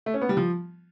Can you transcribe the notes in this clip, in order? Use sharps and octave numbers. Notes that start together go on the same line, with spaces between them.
A3
C#4
B3
G3
F3